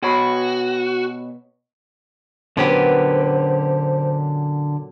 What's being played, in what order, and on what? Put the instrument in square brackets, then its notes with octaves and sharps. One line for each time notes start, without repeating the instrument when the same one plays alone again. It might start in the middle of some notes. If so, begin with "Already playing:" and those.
[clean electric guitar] B2 C#5 B5 [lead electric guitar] F#4
[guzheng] A#2 F#3 B3 [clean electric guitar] D3 C#4 G4 [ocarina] C5